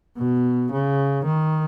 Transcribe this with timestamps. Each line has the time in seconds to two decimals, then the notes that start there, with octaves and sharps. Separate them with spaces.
0.18 B2
0.71 C#3
1.25 D#3